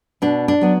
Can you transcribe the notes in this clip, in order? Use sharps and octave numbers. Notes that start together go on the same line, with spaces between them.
B2 D4
D4
F#3 B3